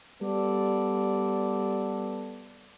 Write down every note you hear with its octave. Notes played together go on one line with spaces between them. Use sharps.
G3 B3 A4 D5